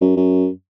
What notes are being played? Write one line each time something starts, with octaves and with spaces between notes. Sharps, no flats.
F#2
F#2